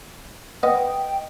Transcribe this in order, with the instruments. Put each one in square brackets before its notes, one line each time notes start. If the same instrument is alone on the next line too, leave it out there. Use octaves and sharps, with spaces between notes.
[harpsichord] B3 [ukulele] D#5 [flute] G5